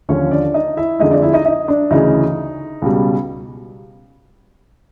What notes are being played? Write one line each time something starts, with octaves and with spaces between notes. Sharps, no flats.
D#2 D3 F3 C#4 C#5
D4 D5
D#4 D#5
E4 E5
F2 D3 F3 G#3 D#4 D#5
D4 D5
E4 E5
D#4 D#5
D#4 D#5
D4 D5
D2 C#3 E3 D#4 D#5
C#2 B2 G3